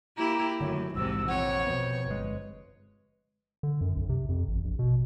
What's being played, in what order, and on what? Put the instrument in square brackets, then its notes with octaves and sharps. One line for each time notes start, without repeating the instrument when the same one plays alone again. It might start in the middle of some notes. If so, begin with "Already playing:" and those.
[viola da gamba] A#3 E4 G4 [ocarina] A#5
[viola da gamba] F#2 [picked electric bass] D3 D#3 A3 [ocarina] C#5
[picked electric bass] A#1 E2 [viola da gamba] G#2 C3 [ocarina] E6
[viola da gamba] F2 C#5 [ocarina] F#5
[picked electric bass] B2 B3 [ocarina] C5
[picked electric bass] G1 G#3 [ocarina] B4
[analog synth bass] D3
F#2
B1
C3
F2
A1
A#1
B2